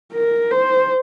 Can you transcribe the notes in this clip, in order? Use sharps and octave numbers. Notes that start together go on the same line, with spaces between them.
A#4
C5